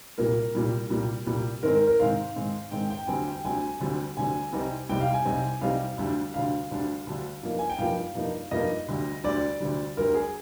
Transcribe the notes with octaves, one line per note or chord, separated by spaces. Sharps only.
C2 A#2 G3 A#4
C2 A#2 G3
C2 A#2 G3
C2 A#2 G3
G#2 D#3 G#3 C4 A#4
A#4
A#4
G#2 D#3 G#3 C4 F5
G#2 D#3 G#3 C4
G#2 D#3 G#3 C4 G5
G5
D2 D3 G3 C4 G#5
G5
D2 D3 G3 C4 G#5
D2 D3 G3 C4
D2 D3 G3 C4 G#5
C2 C3 G3 C4 D#4
C2 C3 G3 C4 D#4 G5
F5
G#5
C2 C3 G3 C4 D#4
C2 C3 G3 C4 D#4 F5
D2 D3 G3 D4
D2 D3 G3 D4 F5
D2 D3 G3 D4
D2 D3 G3 D4
G2 F3 A#3 D#4
G#5
G5
G2 F3 A#3 D#4 F5
G2 F3 A#3 D#4
G2 F3 A#3 D#4 D#5
D2 D3 G3
D2 D3 G3 D5
D2 D3 G3
D2 D3 G3 A#4
G#4